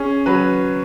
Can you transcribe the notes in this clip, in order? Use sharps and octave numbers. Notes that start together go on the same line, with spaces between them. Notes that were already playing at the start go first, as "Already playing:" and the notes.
Already playing: C#4 G#4
F#3 B4